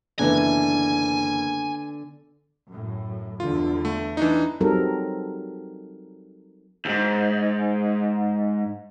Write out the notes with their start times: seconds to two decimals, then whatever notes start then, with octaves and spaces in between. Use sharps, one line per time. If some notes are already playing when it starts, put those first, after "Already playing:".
0.19 F#1 D3 E3 B3 D4 G#5
2.68 F#2 A2
3.40 G1 E2 D3 F4
3.85 A3
4.17 E3 D4 D#4
4.61 F#3 G3 C4 D#4 A4 A#4
6.85 D#2 G#2